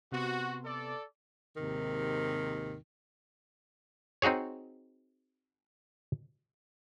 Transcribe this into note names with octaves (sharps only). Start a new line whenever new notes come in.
C3 B3 F#4 C6
A4 D5
D#2 G#2 C3 D#3
C4 D#4 F#4 G#4 C#5